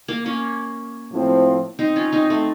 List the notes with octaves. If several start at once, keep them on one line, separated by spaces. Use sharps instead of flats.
A#3
A#3 C#4
A2 F3 C4
C4 D#4
C#4 F4
C4 D#4
A3 C4